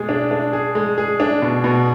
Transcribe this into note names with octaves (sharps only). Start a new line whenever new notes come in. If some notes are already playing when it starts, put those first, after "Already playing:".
Already playing: B2 G#3 G#4
D4
D4
G#4
G#3
G#4
D4
B2
B2